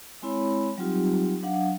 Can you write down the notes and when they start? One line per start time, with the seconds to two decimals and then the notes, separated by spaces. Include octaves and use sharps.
0.22 G#3 C4 E4 C#5 B5
0.78 F#3 G3 C4 D#4 F4 G4
1.42 F#3 D4 F5 F#5